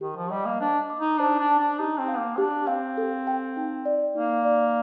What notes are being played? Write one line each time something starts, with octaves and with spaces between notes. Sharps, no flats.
D#3 G4
F3
G3 D#5
A#3
D4 C5
D6
D#4
D4 C5
D4
A5
D4
D#4 G4
C4
F5
A#3
D4 G4
C4 F5
A4
G5
D#4
D5
A#3 D#4
D5